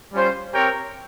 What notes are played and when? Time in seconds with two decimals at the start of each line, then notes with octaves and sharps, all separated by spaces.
0.13 G3 C#4 F4 C5
0.53 C4 G4 A#4 C#5 G5